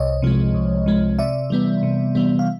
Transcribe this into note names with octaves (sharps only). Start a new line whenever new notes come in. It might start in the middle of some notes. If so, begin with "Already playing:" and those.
Already playing: C2 C#5 D#5
C3 F3 G#3
C2
C3 F3 G#3
C3 D5 E5
E3 G3 B3
C3
E3 G3 B3
F5